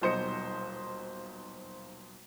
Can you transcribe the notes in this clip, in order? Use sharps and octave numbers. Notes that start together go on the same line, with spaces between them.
D#1 B1 C5 D#5 C#7